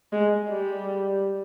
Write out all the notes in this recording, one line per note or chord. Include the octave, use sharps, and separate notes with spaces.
G#3
G3